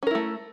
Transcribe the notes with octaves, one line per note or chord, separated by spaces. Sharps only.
A3 C#4 E4 A#4